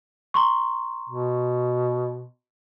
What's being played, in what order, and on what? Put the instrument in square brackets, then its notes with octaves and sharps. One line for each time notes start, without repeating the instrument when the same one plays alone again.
[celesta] A#5 C6 C#6
[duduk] B2